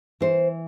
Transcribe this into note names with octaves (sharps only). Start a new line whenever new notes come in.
E3 C5